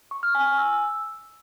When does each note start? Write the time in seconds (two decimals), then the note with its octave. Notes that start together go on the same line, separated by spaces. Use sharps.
0.11 C#6
0.23 F6
0.35 G#5
0.46 G#5
0.58 E6